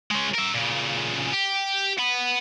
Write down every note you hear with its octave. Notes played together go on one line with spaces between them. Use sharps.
G#3 C#4
A#4 E5
A#2 C#3
G4
F#5 B5